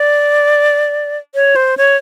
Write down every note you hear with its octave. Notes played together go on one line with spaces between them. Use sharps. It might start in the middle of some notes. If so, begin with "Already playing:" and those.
Already playing: D5
C#5
C5
C#5